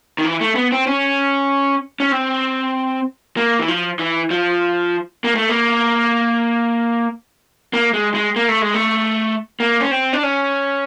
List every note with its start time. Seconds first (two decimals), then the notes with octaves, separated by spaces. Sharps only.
0.18 D#3
0.25 E3
0.41 A3
0.55 B3
0.72 C4
0.87 C#4
2.00 C#4
2.12 C4
3.37 A#3
3.59 E3
3.68 F3
3.99 E3
4.30 F3
5.24 A#3
5.35 A3
5.49 A#3
7.73 A#3
7.94 G#3
8.14 G#3
8.36 A#3
8.49 A3
8.62 G#3
8.74 A3
9.60 A#3
9.81 C#4
9.91 C4
10.13 D4
10.23 C#4